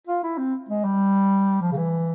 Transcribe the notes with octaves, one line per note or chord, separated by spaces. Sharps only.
F4
E4
C4
G#3
G3
F3
C#3
E3